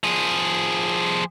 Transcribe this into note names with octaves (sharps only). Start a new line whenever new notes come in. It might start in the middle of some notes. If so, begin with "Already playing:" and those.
F3 G#4